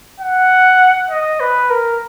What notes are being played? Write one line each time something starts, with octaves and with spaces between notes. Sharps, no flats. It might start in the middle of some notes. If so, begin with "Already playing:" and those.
F#5
D#5
B4
A#4